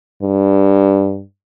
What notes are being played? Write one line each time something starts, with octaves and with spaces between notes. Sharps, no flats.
G2